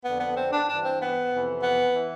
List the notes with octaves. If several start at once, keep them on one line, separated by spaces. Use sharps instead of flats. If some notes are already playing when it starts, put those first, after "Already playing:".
F2 D3 B3
B3
C4
D4
G2 E3 D4
C4
B3
F2 C3 E3
B3
E3